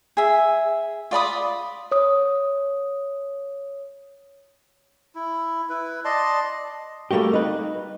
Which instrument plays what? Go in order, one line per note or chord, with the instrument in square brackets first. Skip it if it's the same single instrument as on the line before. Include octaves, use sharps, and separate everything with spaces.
[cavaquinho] G#4 E5
F4 D5 B5 D#6
[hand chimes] C#5 D#6
[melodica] E4
E4 B4
D5 D#5 A5 C6
[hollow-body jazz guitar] G3 A3 A#3 F#4 G4
D#4 B4